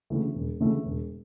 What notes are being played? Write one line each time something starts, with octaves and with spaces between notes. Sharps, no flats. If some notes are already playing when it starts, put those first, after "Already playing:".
D2 C#3 E3 A3
E1
D2 C#3 E3 A3
E1